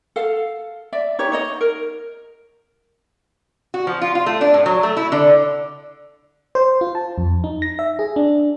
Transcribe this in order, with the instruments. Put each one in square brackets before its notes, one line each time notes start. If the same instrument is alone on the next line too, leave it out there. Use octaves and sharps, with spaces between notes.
[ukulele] A4 F5
D5 E5
D#4 G4 C#5
D#4 C#5 D#5
A#4
[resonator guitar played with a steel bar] F#4
F3
F4
F4
A3
D4
A2
F#3
A3
E4
D3
[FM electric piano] C5
F4
A5
F2
D#4
A#6
E5
G#4
D4